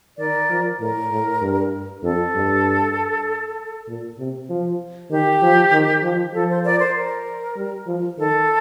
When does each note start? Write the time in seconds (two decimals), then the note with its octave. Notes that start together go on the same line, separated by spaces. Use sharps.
0.18 D#3 A#4 D5
0.50 F3
0.80 A2 A#4
1.11 A2
1.42 G2
2.03 F2 A4
2.35 G2
3.88 A#2
4.19 C3
4.49 F3
5.10 D#3 G4
5.42 F3
5.72 D#3
6.03 F3
6.34 F3 A4
6.49 C5
6.64 A#4 D5
6.79 C5
6.95 A#4
7.56 G3
7.87 F3
8.18 D#3 A4